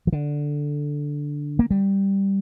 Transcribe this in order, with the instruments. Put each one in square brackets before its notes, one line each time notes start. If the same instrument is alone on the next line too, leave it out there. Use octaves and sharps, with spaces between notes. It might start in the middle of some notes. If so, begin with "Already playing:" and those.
[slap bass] F3
D3
A#3
G3